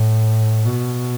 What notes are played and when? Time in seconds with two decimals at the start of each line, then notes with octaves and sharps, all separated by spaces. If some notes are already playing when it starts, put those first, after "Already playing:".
Already playing: A2
0.65 B2